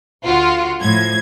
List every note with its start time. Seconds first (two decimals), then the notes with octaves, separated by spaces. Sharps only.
0.23 D2 F4 F#4
0.81 A2 F3 G#6